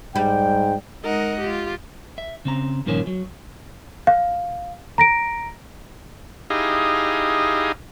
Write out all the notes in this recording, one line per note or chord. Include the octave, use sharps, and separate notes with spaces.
G#2 G3 G5
G#3 D#4 A#4 D#5 F#5
F4 G4
E5
C#3 C4 A#5
G2 A#2 D#3 F3 A#3 C#4
F#3
F5
A#5 A#6 D7
D#4 E4 G4 G#4 D#5 F5